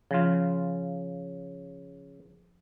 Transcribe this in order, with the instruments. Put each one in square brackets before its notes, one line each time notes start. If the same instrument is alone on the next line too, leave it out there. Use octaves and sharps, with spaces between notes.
[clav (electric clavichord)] C#3 F4 [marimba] F3